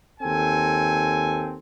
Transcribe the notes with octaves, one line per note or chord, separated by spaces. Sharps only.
D#2 C4 A4 G#5